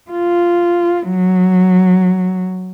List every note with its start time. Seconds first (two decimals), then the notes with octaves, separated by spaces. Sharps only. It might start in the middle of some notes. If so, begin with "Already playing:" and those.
0.11 F4
1.10 F#3